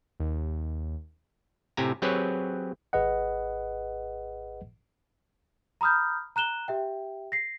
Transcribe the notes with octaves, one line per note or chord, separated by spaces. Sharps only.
D#2
A2 C3 G4 G#5 A#5
F#3 C4 G4 G#4 B4 C#5
G#1 G#4 B4 D#5 F#5
A#5 B5 D#6 F6 G6
A#5 F#6 E7 G7
G4 E5 G5
A#6 C7